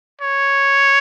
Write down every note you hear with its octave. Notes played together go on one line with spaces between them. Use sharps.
C#5